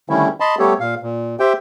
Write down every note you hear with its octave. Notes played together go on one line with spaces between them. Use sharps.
D3 D#3 G3 A3 C#4 E4
D#5 A5 B5 C6
G3 A3 B3 G4 A4 C#5
A#2 F5
A#2
G4 C5 E5 G5